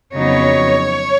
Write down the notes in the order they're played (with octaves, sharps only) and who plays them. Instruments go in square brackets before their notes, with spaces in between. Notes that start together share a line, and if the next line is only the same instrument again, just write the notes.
[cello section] F2 C#3 F#3 B3 D#4 C#5